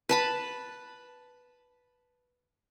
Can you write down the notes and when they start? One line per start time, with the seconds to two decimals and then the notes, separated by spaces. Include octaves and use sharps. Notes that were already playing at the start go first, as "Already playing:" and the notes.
0.09 B4 A5 B5